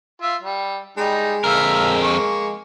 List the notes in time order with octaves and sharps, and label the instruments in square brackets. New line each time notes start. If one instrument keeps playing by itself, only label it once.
[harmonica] F4 E5
G3
[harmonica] G3 D#4 [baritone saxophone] G#3
[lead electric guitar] F2 A#4 [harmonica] E5 F5
[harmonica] A#3 C#6